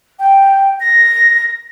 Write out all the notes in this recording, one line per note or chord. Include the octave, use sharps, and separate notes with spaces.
G5
A#6